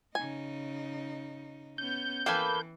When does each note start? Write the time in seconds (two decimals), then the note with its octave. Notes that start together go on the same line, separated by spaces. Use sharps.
0.15 C#3 D#4 G#5
1.78 B3 C#4 G6
2.26 E3 A#3 A4 B4 G5 G#5